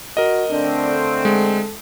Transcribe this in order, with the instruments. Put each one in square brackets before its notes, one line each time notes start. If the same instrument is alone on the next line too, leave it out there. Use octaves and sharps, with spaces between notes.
[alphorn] F#4 [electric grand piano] A#4 D#5
[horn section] D3 A3 C4 [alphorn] D4
[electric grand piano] G#3 [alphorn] A4